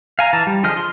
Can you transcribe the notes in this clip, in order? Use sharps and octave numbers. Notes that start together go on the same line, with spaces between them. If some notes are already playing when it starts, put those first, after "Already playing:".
F5 G#5 A#5
E3 A5 A#5
G3
D3 F3 G#4 D#5 F6
C6